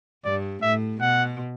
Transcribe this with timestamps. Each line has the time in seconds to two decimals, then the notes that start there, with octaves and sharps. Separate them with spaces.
0.25 G2 D5
0.62 A2 E5
1.01 B2 F#5